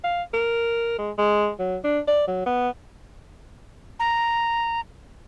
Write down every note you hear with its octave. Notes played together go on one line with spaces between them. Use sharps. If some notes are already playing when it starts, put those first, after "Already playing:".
F5
A#4
G#3
G#3
F#3
D4
D5
F#3
B3
A#5